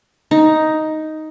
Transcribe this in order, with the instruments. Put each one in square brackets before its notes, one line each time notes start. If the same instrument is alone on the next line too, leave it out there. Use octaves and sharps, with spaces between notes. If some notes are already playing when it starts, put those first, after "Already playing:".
[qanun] D#4